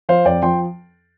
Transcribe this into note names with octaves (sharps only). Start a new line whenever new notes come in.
F3 C5 F5
F2 D5 G5
F3 G5 C6